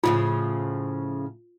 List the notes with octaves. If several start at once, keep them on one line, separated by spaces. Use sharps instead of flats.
A2 C#3 F3 F4